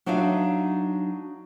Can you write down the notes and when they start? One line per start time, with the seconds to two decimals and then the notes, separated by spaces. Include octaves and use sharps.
0.06 F#3 D4 D#4 E5 F5